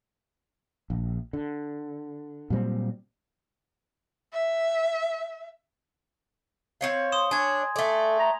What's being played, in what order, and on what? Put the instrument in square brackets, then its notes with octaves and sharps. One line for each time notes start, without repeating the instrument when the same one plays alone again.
[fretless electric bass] A#1
D3
A#2 F#3 G3 C4
[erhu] E5
[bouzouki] C4 C#5 F5
[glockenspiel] C6 D#6 E7
[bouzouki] D4 C#5 [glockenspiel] G#5 G#6
[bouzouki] A3 D5 [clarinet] A4
[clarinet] A#5